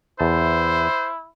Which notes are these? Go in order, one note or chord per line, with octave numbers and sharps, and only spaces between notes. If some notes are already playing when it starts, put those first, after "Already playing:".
E2 E4 C5 A5